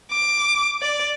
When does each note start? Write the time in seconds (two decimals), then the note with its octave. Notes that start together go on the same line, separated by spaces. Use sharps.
0.12 D6
0.82 D5